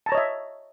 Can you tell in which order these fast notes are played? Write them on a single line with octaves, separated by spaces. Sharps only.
A5 A#5 C#5 D#5 E5